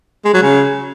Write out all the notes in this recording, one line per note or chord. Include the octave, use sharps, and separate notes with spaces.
G#3
F#3
C#3